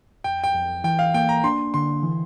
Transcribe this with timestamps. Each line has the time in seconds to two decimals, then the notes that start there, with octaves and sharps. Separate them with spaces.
0.24 F2 G5
0.44 G5
0.55 F2
0.84 E3 G5
0.99 F5
1.14 A#3 G5
1.29 A#5
1.44 D4 C6
1.74 D3 C6
2.03 E3